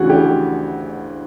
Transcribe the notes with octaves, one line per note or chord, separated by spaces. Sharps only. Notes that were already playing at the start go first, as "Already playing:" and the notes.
Already playing: D2 C#3 E3 F#4 G#4
G4